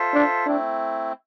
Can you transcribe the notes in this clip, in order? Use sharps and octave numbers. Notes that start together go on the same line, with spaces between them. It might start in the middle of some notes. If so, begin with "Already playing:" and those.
Already playing: F4 A4 C5 E5
D4
A3 C4 D4 E4